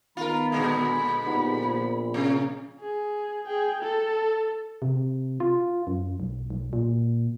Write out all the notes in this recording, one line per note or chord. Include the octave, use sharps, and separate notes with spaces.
D#3 B3 F4 A#4 B5
A#2 D3 G#3
A#1 B3 D#4 G4
A#3 B3 F4
C3
G#4
G#4 G5
A4
C3
F4
F#2
B1
B1
A#2